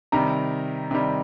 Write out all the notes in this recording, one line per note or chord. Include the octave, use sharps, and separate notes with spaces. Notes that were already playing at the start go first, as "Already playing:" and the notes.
C3 D#3 G3 A#5
C3 D#3 G3